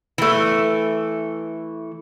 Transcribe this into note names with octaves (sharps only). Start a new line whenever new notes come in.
E3 A3